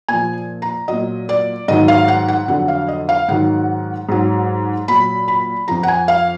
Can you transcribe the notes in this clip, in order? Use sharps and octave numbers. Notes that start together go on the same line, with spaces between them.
A#2 F3 G#5
A#5
A#2 F#3 D#5
D5
G#2 D#3 F#3 D#5
F5
F#5
F#5
F2 D3 F#3 F#5
F5
D#5
F5
G#2 D#3 F#3 F#5
G#2 F#3
A#2 F#3 B5
B5
F2 F3 A#5
F#5
G#5
F5